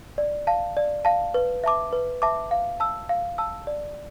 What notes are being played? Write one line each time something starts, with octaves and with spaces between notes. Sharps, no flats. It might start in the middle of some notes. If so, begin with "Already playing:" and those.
D5
F5 A5
D5
F5 A5
B4
E5 A5 D6
B4
E5 A5 D6
F5
A5 E6
F5
A5 E6
D5